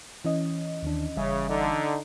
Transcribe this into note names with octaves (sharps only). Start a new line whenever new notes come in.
E3 C#4 D#5
D#2 D#3 D4
G1 C#3 G3 E5
D3 D#4